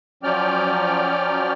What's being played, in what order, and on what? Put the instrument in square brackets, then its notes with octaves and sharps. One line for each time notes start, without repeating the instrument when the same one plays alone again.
[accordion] F3 F#3 C#4 D5 G5 F6